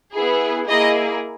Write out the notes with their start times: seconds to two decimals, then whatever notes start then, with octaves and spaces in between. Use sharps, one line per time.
0.13 B3 E4 G#4
0.68 A#3 E4 G#4 D#5